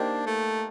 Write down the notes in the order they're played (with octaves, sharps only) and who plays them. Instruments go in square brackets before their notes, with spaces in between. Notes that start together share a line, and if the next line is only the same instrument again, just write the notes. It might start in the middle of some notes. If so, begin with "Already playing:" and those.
Already playing: [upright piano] A#3 D#4 G4 C5 [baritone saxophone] D4
[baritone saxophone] A3